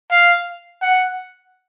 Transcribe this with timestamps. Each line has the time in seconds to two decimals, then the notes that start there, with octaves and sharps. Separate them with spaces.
0.11 F5
0.82 F#5